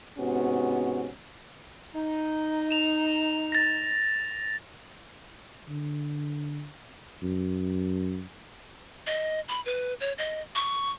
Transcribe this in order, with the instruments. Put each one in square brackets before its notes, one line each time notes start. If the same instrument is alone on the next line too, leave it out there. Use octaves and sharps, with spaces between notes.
[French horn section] G#2 C3 B3 C#4 F#4
[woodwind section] D#4
[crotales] E7 F7
A6 A#6
[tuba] D3
F#2
[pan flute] D#5
B5
B4
C#5
D#5
C#6